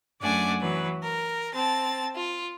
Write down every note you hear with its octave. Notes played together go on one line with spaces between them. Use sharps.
F#2 A3 D4 D5 F#5 G#5
E3 F#3 B4
A#4
C4 A5 A6
F4